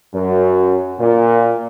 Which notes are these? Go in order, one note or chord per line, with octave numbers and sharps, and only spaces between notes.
F#2
A#2